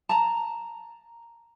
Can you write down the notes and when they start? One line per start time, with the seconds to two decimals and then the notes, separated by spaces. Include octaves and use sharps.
0.09 A5 A#5